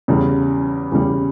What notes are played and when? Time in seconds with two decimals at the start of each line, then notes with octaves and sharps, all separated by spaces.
0.08 E2 C#3 G3
0.92 E2 C#3 G3